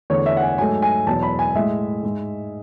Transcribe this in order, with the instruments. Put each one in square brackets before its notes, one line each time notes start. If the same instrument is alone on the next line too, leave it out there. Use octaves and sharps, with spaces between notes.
[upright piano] E2 D3 A3 C#5
E5
F#5
G#5
G#2 F#3 A3 G#5
G#5
E2 B2 F#3 A5
B5
G#5
A2 G#3 E5
G#2 G#3